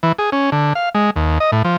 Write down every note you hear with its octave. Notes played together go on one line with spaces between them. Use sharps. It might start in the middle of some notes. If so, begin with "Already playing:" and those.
E3
G#4
C#4
D3
F5
G#3
D#2
D#5
A2
F3